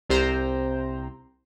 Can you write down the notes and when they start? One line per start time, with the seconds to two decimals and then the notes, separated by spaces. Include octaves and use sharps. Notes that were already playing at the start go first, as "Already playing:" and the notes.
0.10 C2 C3 C5 G5 A#5